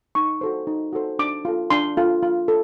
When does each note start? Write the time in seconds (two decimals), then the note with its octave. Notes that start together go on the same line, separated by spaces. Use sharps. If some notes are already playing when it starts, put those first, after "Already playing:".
0.15 D#4 C#6
0.41 F#4 A4 C5
0.67 D#4
0.93 F#4 A4 C5
1.19 D4 D6
1.45 F4 A4
1.70 D4 C6
1.97 F4 A4
2.22 F4
2.48 A4